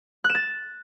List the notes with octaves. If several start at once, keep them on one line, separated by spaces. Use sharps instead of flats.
F#6
E7
A6